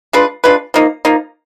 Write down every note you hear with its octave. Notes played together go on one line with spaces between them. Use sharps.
G#3 D4 F4 B4
G#3 D4 F4 B4
F3 A#3 D#4
F3 A#3 D#4